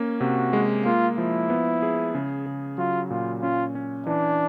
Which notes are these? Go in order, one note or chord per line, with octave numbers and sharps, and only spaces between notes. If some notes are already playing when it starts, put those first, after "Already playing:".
Already playing: A#3 C#4
C3 F#4
G#3
A#3 F4
F3 E4
B3
G#4
C#3
C#3
F#3 F4
A#2 F4
C#4 F4
C#4
E3 D4